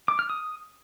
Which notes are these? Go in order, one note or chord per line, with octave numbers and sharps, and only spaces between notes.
D6
F6
D#6